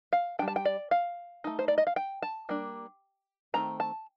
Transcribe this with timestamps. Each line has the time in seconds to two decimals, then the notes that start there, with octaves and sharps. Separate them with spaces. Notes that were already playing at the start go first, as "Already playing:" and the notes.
0.13 F5
0.39 G3 D4 G5
0.48 A5
0.56 G5
0.65 D5
0.91 F5
1.44 A3 D#4
1.59 C5
1.68 D5
1.78 D#5
1.87 F5
1.96 G5
2.22 A5
2.49 G3 A#3 D4
3.54 D#3 A3 C4 A#5
3.80 A5